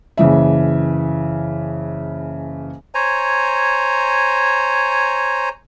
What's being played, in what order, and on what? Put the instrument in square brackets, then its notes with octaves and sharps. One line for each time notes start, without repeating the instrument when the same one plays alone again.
[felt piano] F#1 C#3 E3 E5
[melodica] C5 C#5 G#5 A#5